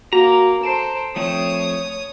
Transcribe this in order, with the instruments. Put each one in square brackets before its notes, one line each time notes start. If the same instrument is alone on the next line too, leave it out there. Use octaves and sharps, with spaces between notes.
[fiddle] A#3 [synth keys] F#4 [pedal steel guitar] A#5
[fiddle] A4 C5 [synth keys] C7 D7 E7
[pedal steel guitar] F3 A3 C4 [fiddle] C#5 D#6